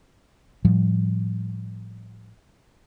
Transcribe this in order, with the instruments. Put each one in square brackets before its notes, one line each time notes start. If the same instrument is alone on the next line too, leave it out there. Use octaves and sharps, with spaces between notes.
[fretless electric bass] A2 F3 G3